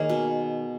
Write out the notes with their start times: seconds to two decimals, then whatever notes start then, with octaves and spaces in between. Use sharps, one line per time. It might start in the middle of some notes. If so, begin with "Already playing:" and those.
Already playing: D#3 A#3 G#4 C#5 D#5
0.09 B2